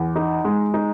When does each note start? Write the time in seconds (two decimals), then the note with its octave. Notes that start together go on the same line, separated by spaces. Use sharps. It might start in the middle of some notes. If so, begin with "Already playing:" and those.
Already playing: E2
0.16 D#4
0.45 G#3
0.74 D#4